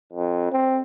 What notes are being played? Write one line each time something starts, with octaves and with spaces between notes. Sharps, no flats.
F2
C4